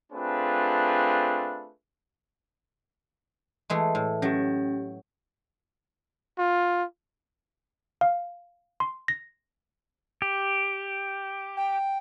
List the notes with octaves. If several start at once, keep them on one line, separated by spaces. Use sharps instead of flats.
A3 C4 D4 F4 G#4 B4
E3 G#3 A3
A2
F#3 C#4 G4
F4
F5
C6
A#6
G4
G5